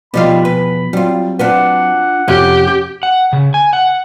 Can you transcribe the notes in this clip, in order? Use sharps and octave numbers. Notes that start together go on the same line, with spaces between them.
B2 F3 G3 B3 D#4 F4 B5
E2 B4
F#3 G3 C4 F4
D4 F4 B4 F#5
F2 C3 F3 C#4 G4
F#5
C#3
G#5
F#5